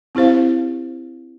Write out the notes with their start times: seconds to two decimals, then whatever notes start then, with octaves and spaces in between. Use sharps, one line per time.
0.15 C4 E4 G4 C5 F5